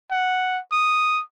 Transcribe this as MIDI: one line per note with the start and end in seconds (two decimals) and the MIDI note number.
0.11 0.59 78
0.72 1.22 87